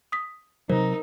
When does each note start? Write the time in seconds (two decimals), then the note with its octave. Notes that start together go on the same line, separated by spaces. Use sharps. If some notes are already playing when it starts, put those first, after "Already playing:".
0.12 D#6 B6
0.70 C3 F#3 D#4 A#4 C5